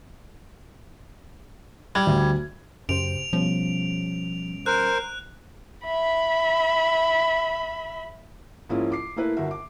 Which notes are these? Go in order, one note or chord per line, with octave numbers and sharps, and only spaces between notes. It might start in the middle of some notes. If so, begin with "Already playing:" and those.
G3 G#6
D2
F#2 C#3 G4 C5 D7 F7
B2 F3 G3 C#4
A#4 C5 F#6
E5 B5
G#2 F3 A#3 C#4 E4 F4
D6 C7
A3 A#3 E4 A#4 B4
G1 F#4 A#4 E5
D6